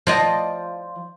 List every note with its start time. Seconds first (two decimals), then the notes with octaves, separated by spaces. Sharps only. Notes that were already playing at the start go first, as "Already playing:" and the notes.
0.07 F3 D5 D#5